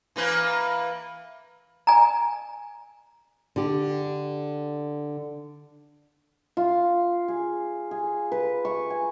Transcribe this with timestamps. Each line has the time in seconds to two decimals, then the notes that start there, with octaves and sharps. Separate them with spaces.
0.16 E3 A#3 B4
1.87 G#5 A#5
3.56 D3 G4
6.57 F4
7.28 G#4
7.91 G#4
8.32 B4
8.65 C#6
8.90 G#5